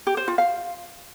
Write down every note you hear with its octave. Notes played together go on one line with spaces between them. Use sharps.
G4
C5
F4
F5